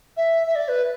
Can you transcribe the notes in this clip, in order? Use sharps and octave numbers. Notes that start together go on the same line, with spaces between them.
E5
E5
D5
B4